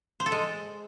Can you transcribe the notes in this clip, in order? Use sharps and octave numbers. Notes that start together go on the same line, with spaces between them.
C5
A4
G#3